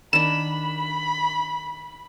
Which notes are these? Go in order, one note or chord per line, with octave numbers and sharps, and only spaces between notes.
D#3 D4 B5 E7